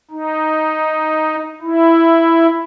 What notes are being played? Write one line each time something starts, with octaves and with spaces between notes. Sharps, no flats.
D#4
E4